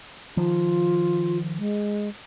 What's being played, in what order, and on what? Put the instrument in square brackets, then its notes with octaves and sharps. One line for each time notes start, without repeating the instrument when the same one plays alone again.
[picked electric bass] D#3 F3 [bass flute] F4
[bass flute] G#3